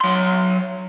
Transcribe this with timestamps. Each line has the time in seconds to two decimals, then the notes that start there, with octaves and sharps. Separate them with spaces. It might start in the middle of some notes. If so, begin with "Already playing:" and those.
0.01 F#3 C6